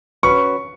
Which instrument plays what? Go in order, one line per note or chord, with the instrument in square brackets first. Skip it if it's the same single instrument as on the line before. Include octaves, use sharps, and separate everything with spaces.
[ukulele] C#4 F#4 B4 [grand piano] C#6